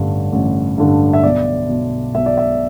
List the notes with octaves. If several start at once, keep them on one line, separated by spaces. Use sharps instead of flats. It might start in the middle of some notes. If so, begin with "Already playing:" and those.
Already playing: A1 G2 D3
A1
G2 D3
E5
B1 D5
B2
B1 E5
D5
E5